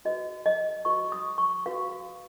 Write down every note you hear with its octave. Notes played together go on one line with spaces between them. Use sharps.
F#4 B4 D#5
D#5
F#4 B4 C#6
D#6
C#6
F#4 B4 F5